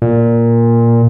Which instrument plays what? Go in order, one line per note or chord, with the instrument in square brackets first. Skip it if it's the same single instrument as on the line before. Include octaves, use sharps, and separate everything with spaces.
[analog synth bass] A#2